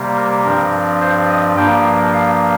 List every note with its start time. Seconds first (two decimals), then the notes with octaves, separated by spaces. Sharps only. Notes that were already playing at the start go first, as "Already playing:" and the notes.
Already playing: C3 G3 A#3
0.17 A#4
0.45 G2 F3 C4 A#4
1.01 C5
1.29 D#5
1.57 G2 F3 A#3 G5
2.14 F5